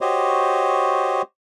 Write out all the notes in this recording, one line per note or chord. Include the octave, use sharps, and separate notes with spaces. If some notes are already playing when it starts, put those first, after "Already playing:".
F#4 G4 C5 C#5 D#5